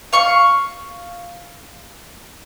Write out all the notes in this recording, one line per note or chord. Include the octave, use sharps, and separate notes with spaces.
F5 C#6